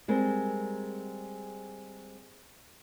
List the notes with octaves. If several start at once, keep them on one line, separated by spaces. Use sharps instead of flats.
G3 G#3 C4 A#4